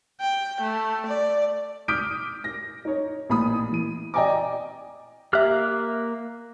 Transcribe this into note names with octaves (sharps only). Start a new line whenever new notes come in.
G5
A3
D5
D6 D#6 F6 G6 B6 D7
A#6
D#4 C#5
A1 A#2 B5 D#6
E3 D#7
D5 D#5 G5 G#5 A#5 D6
A#3 G4 E5 F6 F#6